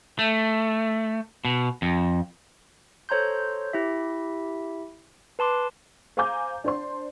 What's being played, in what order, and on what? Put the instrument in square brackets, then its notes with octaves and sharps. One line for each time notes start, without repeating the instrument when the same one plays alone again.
[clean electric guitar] A3
B2
F2
[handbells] A4 C5 C#5 A#5 C6 G6
E4 G4 E5
B4 A5 C6 D6
[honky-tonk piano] C5 F5 G#5 A#5 D6 G6
D4 C5 C6